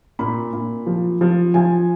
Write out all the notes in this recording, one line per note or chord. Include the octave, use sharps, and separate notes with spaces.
A#2 B5
A#2
F3
F3
F3 G#5